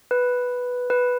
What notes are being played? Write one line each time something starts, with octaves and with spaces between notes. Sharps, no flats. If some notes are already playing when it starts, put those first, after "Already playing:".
B4
B4